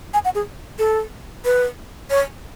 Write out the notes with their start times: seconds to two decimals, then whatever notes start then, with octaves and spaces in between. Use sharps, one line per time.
0.14 G#5
0.25 F#5
0.35 G#4
0.79 A4
1.45 B4
2.10 C#5